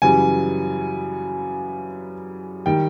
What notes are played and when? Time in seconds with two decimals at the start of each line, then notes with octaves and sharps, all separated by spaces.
0.02 F#2 C#3 E3 G3 G#5
2.66 D#3 G3 G5